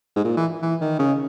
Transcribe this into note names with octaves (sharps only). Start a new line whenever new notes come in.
G#2
A#2
E3
E3
D#3
C#3